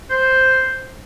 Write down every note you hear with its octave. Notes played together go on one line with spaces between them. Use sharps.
C5